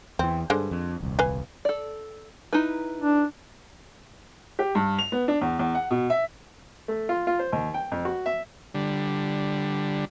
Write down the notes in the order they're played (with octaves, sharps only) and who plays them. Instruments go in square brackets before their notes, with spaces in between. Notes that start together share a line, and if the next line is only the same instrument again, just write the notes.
[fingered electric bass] E2 E3 [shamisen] C4
[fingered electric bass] G2 [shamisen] D3 G#3 C5
[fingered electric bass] F2
D#1 C2
[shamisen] B4 F5 G#5
[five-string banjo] A4 D5
D#4 E4 B4
[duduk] D4
[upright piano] G4
G2
F7
B3
D4
E2
E2
F#5
B2
E5
[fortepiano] A3
F4
F4
C5
D#2
G5
F2
F#4
E5
[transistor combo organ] D3 G3